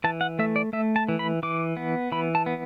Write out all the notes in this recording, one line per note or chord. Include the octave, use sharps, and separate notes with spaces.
E3 A5
F#5
A3 E5
D5
A3 E5
A5
E3
B5
E3 D6
B3
E3 B5
A5
B3